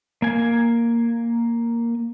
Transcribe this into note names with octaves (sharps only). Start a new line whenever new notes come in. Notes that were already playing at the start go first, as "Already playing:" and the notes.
A#3 G#5